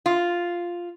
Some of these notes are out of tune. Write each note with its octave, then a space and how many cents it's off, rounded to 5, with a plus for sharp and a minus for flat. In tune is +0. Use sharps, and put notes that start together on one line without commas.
F4 +0